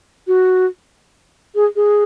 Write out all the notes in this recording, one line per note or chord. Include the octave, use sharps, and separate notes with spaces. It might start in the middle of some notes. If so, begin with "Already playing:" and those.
F#4
G#4
G#4